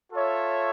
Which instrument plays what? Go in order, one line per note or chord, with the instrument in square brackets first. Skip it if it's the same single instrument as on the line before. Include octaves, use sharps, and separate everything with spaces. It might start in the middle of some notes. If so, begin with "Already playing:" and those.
[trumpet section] F4 A4 C#5 E5